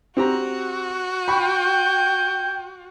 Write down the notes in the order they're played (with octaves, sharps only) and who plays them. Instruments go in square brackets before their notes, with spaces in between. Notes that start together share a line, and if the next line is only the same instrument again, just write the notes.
[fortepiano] C4 G4 A#5 [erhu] F#4
[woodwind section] G5 [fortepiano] B5 C#6 [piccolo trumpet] G6